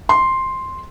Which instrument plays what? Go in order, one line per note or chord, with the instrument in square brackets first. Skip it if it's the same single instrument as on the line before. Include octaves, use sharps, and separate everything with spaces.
[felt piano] C6